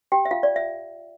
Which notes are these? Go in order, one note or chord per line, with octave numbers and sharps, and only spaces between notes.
G4 G5
E5
F4 F5
D5
E5